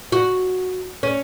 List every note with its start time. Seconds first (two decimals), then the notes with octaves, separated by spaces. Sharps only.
0.12 F#4
1.03 C#4